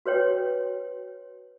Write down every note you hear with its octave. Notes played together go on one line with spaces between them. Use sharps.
F#4 B4 C#5 G5